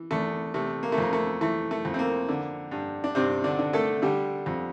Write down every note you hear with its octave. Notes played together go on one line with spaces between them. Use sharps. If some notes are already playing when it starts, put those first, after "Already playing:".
Already playing: E3
E2 A3
C3 A3
A#3
A3
F2 A#3
A3
E3 A3
A3
F2
C4
A#3
D3
G2
D4
G2 C3 C4
D3 D4
D3
A3 A4
D3 G3 G4
F2